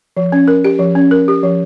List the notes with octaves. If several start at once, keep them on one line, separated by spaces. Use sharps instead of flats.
F3
C#4
A#4
G4
F3
C#4
A#4
G4
F3